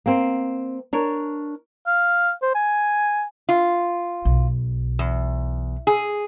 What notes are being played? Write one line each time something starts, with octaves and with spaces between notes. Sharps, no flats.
A#3 C4
D4 A#4 C#5
F5
C5
G#5
F4
B1
E2
G#4